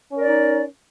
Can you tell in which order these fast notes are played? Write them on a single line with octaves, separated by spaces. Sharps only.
C#4 A#4 D5 D#4